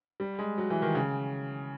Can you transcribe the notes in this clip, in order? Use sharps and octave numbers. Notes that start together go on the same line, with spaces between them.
G3
G#3
F#3
E3
D#3
C#3